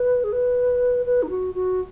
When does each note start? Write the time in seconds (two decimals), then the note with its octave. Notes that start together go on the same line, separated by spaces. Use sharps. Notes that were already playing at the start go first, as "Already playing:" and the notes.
Already playing: B4
0.24 G#4
0.33 B4
1.06 B4
1.23 D#4
1.30 F#4
1.55 F#4